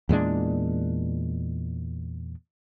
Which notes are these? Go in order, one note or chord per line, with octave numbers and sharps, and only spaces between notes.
E2 A#2 G#3 D4